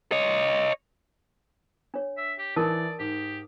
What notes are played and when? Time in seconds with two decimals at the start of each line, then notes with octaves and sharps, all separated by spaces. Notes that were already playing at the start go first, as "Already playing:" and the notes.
0.12 C#5 D#5
1.94 D4 C#5
2.18 E5
2.39 G4
2.56 E3 D#4 A#4 D5 A5 D#6
2.99 G#2 G4